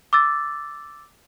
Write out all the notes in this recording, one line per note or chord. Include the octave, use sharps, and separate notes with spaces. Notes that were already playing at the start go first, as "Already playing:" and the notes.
D6 E6 A6